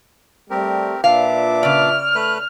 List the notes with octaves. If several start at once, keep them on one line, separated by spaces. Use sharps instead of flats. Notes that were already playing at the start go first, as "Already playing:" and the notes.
G3 A3 C4 G4 A#4
A#2 D4 F4 B4 E5 F5 D6
C#3 D5 F6
A3 B4 F#6